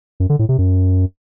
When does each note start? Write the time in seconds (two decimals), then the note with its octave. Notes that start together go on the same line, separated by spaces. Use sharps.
0.20 F#2
0.30 D3
0.39 A2
0.49 C3
0.58 F#2